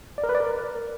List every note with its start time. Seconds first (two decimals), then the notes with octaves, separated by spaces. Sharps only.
0.18 D5
0.24 A#4
0.29 B4
0.35 D5
0.40 A#4